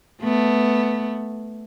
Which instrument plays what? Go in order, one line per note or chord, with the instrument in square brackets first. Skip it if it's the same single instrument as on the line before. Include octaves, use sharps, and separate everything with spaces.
[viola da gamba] A3 B3